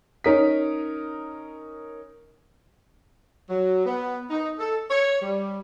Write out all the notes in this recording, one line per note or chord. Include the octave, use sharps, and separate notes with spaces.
C#4 D#4 A#4 D#6 B6
F#3
B3
D#4
A4
C#5
G3